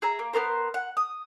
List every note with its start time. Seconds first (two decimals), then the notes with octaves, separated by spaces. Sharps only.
0.02 G#4 E5 A#5
0.19 A#3
0.33 B3 D4 A#4 C5
0.74 F#5
0.97 D#6